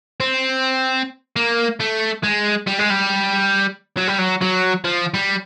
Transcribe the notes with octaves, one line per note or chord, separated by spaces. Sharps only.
C4
A#3
A3
G#3
G3
G#3
G3
F#3
G3
F#3
F#3
F3
G3